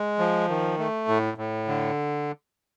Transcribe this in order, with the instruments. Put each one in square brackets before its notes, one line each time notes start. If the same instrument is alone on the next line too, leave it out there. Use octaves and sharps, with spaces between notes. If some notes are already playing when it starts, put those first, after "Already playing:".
Already playing: [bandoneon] G#3
F3
D#3
A3
A2
A2
D3